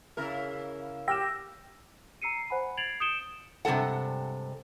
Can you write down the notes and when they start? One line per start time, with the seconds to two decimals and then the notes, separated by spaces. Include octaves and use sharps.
0.17 C#3 E4 A#4
1.08 G4 G5 E6 F6 A#6 E7
2.22 A#5 E6 C7 C#7 D#7
2.50 C5 F#5 G#5 B5
2.77 G#6 A6 C7 D7 F7 F#7
3.00 D#6 G6 C#7 D7 E7 G7
3.65 G2 C3 G3 G#3 A4 F#5